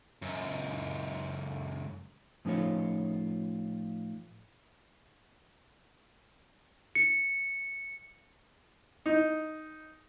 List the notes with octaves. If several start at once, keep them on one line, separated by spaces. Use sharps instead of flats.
C#2 F#2
A2 F3 C#4 D#4 F4 C#5
C#7
D#4